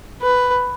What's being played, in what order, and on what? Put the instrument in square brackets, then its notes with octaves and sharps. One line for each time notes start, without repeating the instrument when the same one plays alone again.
[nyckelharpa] B4